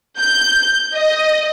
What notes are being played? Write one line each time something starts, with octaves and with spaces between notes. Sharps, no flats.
G6
D#5